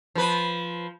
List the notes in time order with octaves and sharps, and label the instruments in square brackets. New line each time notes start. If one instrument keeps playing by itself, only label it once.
[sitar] F3 B4